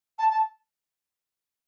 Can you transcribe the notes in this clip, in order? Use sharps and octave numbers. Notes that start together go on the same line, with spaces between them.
A5
A5